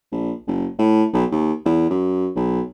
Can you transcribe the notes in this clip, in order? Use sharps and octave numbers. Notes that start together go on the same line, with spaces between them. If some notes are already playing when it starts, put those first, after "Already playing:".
A#1
F#1
A2
B1
D#2
E2
F#2
B1